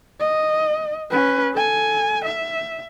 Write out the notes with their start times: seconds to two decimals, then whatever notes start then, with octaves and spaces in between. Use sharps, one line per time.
0.19 D#5
1.10 C#4 B4
1.54 A4 G#5
2.25 E5